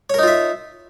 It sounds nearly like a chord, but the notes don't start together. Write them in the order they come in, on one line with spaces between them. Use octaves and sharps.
C#5 A#4 D#4 F4 E5